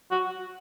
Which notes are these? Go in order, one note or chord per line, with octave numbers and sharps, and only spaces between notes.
F#4